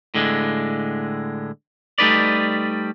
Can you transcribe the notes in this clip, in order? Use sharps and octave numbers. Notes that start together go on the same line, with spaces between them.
A2 D3 G#3
G3 A3 D#4 B4 D5